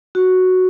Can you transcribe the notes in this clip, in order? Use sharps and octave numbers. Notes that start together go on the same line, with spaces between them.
F#4